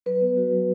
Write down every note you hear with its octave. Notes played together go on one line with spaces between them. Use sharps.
F#3 B4
B3
F#4
F#3